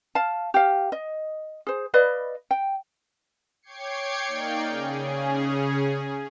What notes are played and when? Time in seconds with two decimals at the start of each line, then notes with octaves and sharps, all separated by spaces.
0.15 F5 A5
0.54 G4 F5
0.92 D#5
1.67 G#4 C5
1.94 B4 D5 D#5 F5
2.51 G5
3.62 C#5 G5 D6 G#6 C7 C#7
4.28 A#3 D#4 D5 F5 G5
4.68 C#3 C#4 G#4